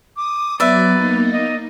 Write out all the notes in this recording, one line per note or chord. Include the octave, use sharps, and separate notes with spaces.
D6 D#6
F#3 B3 B4 D5 E5
A#3 D#4
D#5